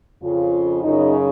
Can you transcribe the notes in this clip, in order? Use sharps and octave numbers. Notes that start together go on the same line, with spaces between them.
F2 C#3 F4
F#2 C#3 D#4